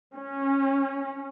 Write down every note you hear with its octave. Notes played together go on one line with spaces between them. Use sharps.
C#4